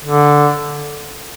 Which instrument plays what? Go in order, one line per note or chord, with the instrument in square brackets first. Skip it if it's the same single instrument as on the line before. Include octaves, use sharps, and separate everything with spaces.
[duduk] D3